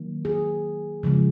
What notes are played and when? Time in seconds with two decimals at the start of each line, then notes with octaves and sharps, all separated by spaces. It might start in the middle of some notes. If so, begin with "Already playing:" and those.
Already playing: D#3 F#3 A#3
0.25 G#4
1.03 C#3 F3 G#3